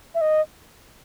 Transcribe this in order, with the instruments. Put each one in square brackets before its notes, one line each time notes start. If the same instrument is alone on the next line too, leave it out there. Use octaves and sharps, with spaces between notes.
[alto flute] E5
D#5